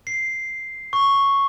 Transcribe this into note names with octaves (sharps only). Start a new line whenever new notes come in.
C7
C#6